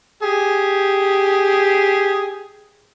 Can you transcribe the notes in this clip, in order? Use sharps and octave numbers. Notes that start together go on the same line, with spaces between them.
G4 G#4